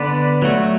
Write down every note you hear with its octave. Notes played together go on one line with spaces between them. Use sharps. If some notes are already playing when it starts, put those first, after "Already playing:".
Already playing: D3 B3 D4 B4 D5
F#3 A3 F#4